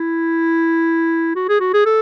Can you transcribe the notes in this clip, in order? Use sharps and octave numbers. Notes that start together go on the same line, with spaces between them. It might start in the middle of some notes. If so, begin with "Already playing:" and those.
Already playing: E4
F#4
G#4
F#4
G#4
A4